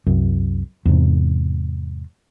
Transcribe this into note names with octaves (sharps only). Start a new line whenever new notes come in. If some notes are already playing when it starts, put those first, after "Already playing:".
C2 F#2
E2 G#2 C3